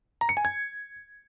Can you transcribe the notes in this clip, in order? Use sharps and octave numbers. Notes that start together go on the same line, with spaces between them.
A#5
C#7
G#5
G#6